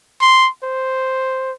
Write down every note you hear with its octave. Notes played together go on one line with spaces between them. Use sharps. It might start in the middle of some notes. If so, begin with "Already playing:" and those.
C6
C5